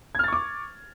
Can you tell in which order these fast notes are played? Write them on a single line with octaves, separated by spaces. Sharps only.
G#6 F6 A6 C#6 D6